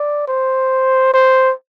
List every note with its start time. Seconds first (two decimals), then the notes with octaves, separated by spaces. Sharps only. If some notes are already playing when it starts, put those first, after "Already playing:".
Already playing: D5
0.28 C5
1.14 C5